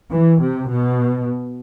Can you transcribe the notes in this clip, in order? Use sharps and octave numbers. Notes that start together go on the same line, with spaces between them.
E3
C3
B2